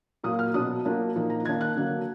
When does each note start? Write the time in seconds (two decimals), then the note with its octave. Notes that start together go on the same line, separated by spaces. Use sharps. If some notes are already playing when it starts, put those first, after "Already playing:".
0.23 A#2 F#3 A#3 F4 D#6
0.39 F6
0.54 B2 F#3 D4 D#6
0.85 F#3 A#3 D4 F4
1.16 A#2 F3 A#3 D#4
1.30 A#5
1.45 D#3 A#3 D4 G#6
1.61 F#6
1.76 D3 F#3 A#3 D4